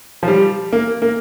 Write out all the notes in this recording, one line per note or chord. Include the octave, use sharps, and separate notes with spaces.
F3
G3
A#3
A#3